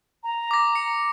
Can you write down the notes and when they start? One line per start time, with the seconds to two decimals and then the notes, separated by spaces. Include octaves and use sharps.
0.24 A#5
0.51 D6 A#6
0.75 C#7